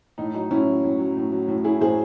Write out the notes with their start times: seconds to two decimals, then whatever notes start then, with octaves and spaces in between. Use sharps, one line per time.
0.18 A2 D#4
0.34 F#3 D#4
0.50 A2 C#4 E4
0.67 F#3
0.84 A2
0.99 F#3
1.17 A2
1.32 F#3
1.48 A2
1.64 F#3 E4 G#4
1.81 A2 G#4 C5